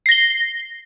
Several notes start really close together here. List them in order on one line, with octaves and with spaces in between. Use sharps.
C7 A#6 G7